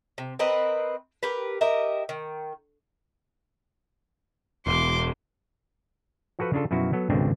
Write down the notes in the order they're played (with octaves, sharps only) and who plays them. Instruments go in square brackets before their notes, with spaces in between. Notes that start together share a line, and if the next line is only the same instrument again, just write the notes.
[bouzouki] C3
C4 A#4 B4 D#5
G4 A#4 B4
G4 A#4 D#5 E5
D#3
[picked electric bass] E1 [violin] C6 D6
[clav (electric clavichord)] F3 F#4 A4 B4 F#5
C#3 D4 F4 A4
F#2 B2 F3 E4 F#4
F#3 B3 A4
G#1 C#2 B2 D3 C4 D4